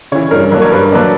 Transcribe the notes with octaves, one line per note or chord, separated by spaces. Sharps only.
C#3 E3 C#5
G2 A#4
F#3 A#3 D4
C#5
G2 B4
F#3 A#3 D4